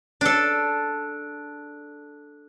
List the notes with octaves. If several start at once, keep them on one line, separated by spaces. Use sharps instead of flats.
D4 A4